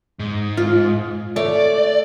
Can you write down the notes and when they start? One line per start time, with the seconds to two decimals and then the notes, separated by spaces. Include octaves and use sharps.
0.19 G#2
0.57 F4
1.36 A3 C#5 D5